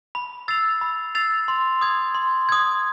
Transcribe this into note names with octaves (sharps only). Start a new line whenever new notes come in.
B5
E6 A6 C7 F7
B5
E6 A6 C7 F7
C6
D#6 G#6
C6
D#6 G#6